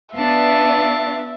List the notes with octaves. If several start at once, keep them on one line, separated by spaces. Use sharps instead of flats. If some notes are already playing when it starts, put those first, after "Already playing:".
B3 D4 F4 E5 A5